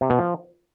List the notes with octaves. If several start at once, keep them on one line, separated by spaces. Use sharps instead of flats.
C3
B2
F3